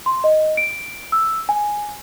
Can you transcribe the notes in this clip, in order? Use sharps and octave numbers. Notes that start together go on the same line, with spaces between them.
C6
D#5
D7
E6
G#5